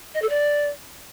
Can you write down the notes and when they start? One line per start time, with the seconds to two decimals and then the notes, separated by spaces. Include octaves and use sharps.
0.14 D#5
0.22 A4
0.29 D5